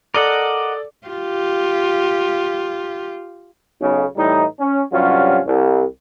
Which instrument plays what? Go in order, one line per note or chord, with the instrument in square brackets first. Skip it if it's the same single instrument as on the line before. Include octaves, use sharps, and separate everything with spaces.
[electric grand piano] A4 D5 D6 [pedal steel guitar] A#4 D#5 F#5
[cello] F4 G4
[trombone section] B1 C#3
A2 E3 G3 D#4
C#4
G2 C3 F#3 C#4 F4 F#4
C2